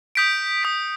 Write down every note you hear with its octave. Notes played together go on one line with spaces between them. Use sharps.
D#6 G6 B6 D7
D#6 G6 B6 D7